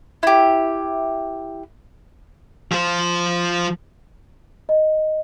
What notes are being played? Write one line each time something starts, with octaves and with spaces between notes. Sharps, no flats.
E4 G4
F3 C5
D#5